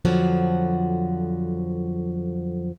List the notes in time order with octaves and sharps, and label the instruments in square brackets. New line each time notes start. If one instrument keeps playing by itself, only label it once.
[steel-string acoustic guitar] F2 D3 F3 F#3 F#4